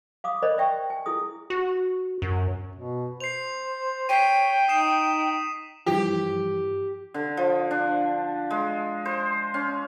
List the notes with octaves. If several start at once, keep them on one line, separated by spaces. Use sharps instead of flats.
F5 D6 D#6
A#4 C5 D5 D#5 B5
D5 E5 G5 C#6
G#5
E4 G#4 D#6
F#4
F#2
B2
C5 C7 F7
C#5 G5 B6 C7 D#7
D#4 D#6 C7 E7
G2 E3 F3 G4
D3
F3
D4
G#3
C5
C#4